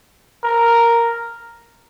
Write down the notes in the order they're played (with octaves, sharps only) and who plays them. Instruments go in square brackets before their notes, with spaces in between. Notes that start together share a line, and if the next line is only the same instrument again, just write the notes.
[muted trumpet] A#4